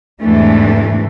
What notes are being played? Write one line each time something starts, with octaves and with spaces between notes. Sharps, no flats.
E2 G#2 C3 E3 A3 D4